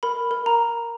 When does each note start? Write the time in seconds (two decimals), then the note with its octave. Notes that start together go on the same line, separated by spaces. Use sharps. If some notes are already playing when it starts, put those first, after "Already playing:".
0.03 A#4 B5
0.31 A#4
0.46 A#5